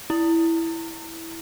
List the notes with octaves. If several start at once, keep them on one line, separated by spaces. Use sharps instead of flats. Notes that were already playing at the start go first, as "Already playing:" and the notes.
E4